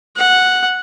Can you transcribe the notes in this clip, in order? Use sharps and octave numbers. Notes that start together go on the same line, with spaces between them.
F#5